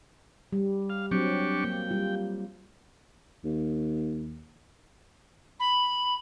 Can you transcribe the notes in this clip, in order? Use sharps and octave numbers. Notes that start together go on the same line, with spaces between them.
G3
F5
F#3 C4 D4 G4 C#6
A#3 G5
G3 F4
D#2
B5